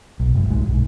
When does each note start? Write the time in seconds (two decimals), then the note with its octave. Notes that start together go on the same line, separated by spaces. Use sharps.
0.20 B1
0.35 F#1 G#2
0.50 C2 G#2 G#3
0.66 B1